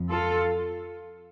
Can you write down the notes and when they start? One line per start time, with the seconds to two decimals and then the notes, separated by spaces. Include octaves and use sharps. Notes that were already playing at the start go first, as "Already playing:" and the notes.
Already playing: F2
0.09 F4 A4